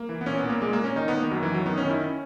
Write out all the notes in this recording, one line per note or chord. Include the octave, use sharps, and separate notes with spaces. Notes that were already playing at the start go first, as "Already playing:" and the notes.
Already playing: A#3
E3
B3
A#2 C#4
B3
A#2
A#3
A#2 G#3
A#3
A#2
C#4
D#3 D#4
B3
D#3
A#3
F#2 F#3
E3
F#2
F#3
D#3 B3
C#4
D#3
E4
C#4